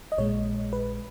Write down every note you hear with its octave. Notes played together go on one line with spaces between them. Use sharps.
D#5
A#1 A#2 G#3 C#5
B4